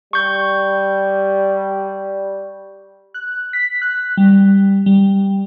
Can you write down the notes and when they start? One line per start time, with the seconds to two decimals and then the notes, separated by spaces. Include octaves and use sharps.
0.13 G3 C#6 G6
3.14 F#6
3.53 B6
3.82 F#6
4.17 G3
4.86 G3